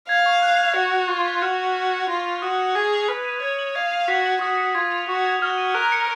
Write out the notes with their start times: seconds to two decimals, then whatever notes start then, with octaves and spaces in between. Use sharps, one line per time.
0.09 F5 G#6
0.26 C#6
0.42 F#6
0.60 F7
0.76 F#4 C#7
0.92 F#6
1.09 F4 C#6
1.25 B6
1.42 F#4 F6
1.59 D#7
1.76 F#6
1.92 C#7
2.08 F4 A#6
2.26 F7
2.42 F#4 D#6
2.59 C#7
2.75 G#4 G#6
2.92 F7
3.08 B4 F6
3.25 D#7
3.42 C#5 G#6
3.59 F#7
3.75 F5 G#6
3.92 D#7
4.08 F#4 B6
4.26 F#7
4.41 F#4 D#6
4.58 C#7
4.75 F4 G#6
4.92 F7
5.08 F#4 C#6
5.26 G#6
5.42 F#4 F6
5.58 D#7
5.74 A#4 F#6
5.92 C#7